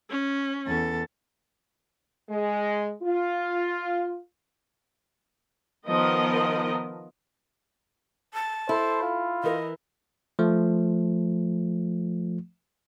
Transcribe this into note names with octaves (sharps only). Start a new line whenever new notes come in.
C#4
E2 A4 A6
G#3
F4
D#3 F3 B3 A#4 D#5
A5
E4 A4 C5
F4
E3 A#4 D#5
F3 A3